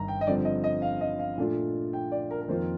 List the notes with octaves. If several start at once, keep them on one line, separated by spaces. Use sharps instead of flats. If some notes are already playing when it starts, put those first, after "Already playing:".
Already playing: G1 G2 D#3 A#5
G5
D#5
G2 D3 F3 C4 D5
D#5
D#5
F5
D#5
F5
A#2 A3 D4 F4
G5
D5
A#4
A#4
F2 D#3 A#3 F4 C5